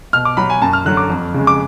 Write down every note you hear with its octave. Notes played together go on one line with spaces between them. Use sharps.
B2 F6
D6
F#3 B5
G#5
F#2 A5
F6
D3 F#3 F#6
D6
F2
C#3 G#3
D6